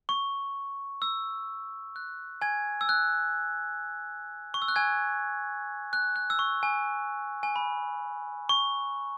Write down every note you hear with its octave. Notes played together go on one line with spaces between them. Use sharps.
C#6
E6
F#6
G#5 G#6
E6
F#6
C#6
E6
F#6
G#5 G#6
F#6
F#6
E6
C#6
G#5
G#5
B5
C#6